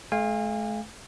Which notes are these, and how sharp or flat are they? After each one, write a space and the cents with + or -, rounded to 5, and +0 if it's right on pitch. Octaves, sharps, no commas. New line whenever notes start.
A3 -45 F5 +0 G#5 -35